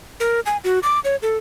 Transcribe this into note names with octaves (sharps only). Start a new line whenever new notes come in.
A#4
G#5
F#4
D6
C#5
A4